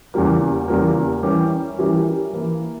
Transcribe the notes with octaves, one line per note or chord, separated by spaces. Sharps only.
E2 C#3 G3 A#3
E2 C#3 G3 A#3
E3 G3 C#4 G4 A#4
E3 G3 C#4 G4 A#4
E3 A#3 E4